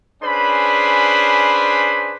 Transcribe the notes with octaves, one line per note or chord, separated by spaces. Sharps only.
C#4 D4 G#4 B4 C5 B5